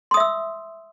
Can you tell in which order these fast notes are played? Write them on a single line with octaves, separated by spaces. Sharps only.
C6 D#6 E5 E6